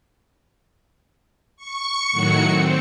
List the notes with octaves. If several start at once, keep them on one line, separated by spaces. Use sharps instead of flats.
C#6 C#7
A2 D#3 F#3 F#4 C#7
C4